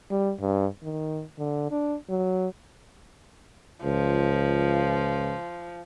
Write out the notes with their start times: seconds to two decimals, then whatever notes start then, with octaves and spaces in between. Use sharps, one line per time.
0.11 G3
0.40 G2
0.82 D#3
1.39 D3
1.71 D4
2.09 F#3
3.84 C#2 F3